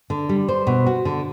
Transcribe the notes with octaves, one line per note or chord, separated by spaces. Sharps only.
D3
G3
C5
B2
F#4
D3